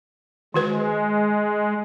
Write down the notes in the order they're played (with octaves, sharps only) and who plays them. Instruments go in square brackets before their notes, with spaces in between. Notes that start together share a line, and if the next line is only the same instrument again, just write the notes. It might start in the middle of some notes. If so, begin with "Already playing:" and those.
[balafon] D#3 F#4 B4 [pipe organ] G#3